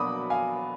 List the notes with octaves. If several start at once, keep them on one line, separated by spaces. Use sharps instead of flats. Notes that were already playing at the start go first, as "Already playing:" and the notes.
Already playing: B2 F#3 A#3 D4 B5 D6 D#6
F5 G#5